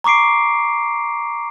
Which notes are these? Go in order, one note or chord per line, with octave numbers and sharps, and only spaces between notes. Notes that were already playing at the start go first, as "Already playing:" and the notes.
A#5 C#6 D6 C7 D7